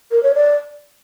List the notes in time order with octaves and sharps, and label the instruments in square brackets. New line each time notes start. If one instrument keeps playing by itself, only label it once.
[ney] A#4
C#5
D5